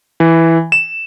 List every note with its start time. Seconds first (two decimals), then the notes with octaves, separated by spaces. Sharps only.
0.20 E3
0.72 E7